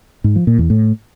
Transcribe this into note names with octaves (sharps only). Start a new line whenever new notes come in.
G#2
F3
A#2
E2
A2